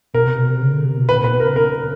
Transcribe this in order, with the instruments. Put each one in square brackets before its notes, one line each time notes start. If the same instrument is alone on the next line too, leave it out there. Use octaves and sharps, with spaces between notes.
[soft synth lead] B2 [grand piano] A#4
[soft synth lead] C3
B2
C3
C#3
D3
C3
B2
[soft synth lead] A#2 [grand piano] B4
[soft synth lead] A#2 [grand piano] B4
[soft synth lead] B2
[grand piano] A#4
[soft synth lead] C#3
[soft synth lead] C#3 [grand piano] A#4